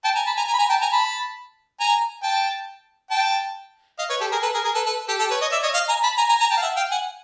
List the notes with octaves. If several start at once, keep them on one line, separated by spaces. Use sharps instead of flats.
G5 A5
G#5 A#5
A5 B5
G#5 A#5
G#5 A#5
B5
G#5 A#5
G5 A5
G#5 A#5
A5 B5
G#5 A#5
G5 A5
G5 A5
D#5 F5
B4 C#5
G4 A4
G#4 A#4
A4 B4
G#4 A#4
G#4 A#4
A4 B4
A4 B4
G4 A4
G4 A4
B4 C#5
C#5 D#5
D5 E5
C#5 D#5
D#5 F5
G#5 A#5
A5 B5
G#5 A#5
G#5 A#5
G#5 A#5
G5 A5
F5
E5 F#5
F5 G5
F#5 G#5